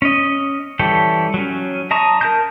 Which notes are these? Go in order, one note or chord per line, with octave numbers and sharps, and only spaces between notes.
C#4 D#5
E3 G3 A4 C#5 G5
F#3 C#4
D#5 A5 A#5 C#6 D#6
A#4 A5 G6